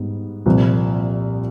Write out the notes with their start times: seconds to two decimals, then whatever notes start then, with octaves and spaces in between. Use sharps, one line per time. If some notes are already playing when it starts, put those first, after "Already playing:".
Already playing: G#2 G3 B3
0.46 C2 A#2 F3